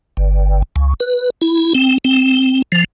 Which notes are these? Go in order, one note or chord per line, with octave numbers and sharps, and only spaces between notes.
G1
C#2
B4
E4
C4
C4
F3